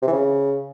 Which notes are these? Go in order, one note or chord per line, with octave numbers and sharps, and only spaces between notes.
C3
E3
C#3